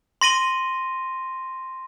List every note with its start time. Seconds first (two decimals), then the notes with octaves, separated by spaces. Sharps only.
0.21 C6 A#6 D#7 G7